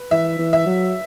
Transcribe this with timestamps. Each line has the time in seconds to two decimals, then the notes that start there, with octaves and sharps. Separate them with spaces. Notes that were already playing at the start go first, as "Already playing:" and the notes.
Already playing: B4
0.11 E3 E5
0.39 E3
0.53 E5
0.66 F#3